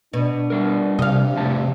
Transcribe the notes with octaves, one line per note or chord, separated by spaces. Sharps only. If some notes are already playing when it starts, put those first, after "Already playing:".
B2 D4
G3 A#4
C3 D4 D#5 F5
F2 A2 A5